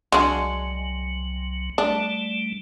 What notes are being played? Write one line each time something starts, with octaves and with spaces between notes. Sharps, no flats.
C2 F#3 G#3 D4 F#4
G3 A3 D4